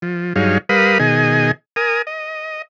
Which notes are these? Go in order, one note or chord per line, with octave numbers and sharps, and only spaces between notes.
F3
G2 F#3 D#4 G#4 C#5 F5
G3 A#4 B4 F5 B5 D#6
B2 D#3 G#4 D#5 G#5
A#4 G#5 D#6
D#5